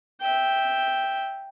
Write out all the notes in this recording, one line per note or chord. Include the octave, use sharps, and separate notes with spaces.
E5 G5